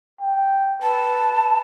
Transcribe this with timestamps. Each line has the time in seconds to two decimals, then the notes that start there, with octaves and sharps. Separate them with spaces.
0.21 G5
0.83 B4 A5